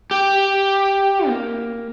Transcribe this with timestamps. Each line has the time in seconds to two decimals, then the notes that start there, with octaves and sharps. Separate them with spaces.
0.11 G4
1.28 A#3